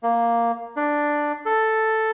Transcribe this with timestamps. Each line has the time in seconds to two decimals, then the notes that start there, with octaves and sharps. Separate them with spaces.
0.03 A#3
0.76 D4
1.46 A4